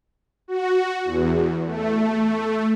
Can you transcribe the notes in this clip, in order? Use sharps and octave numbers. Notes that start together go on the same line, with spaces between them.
F#4
E2
A3